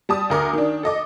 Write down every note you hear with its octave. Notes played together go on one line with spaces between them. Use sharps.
G3 A5 D#6
D2 A#4 D6
D#3 D4
A4 D#5 D6